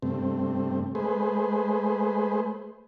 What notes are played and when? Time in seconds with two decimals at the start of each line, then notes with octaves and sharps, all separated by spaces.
0.03 G2 C3 A3 C4
0.95 G#3 A3 G#4 B4 C5